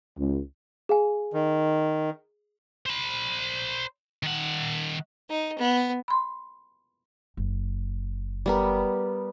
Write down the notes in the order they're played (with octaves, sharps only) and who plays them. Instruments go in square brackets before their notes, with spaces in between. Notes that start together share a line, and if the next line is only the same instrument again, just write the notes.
[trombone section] C#2
[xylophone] G#4 F5 G#5
[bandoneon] D#3
[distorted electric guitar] C5 B5
D#3 F#5
[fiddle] D#4
B3
[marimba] B5 C6
[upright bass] F#1
[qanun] G3 B3 A#4